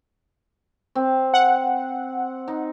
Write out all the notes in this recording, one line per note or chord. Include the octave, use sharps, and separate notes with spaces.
C4
F#5
D#4